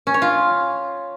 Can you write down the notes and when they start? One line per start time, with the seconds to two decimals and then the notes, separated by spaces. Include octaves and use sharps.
0.07 C#4
0.14 C#5
0.22 F4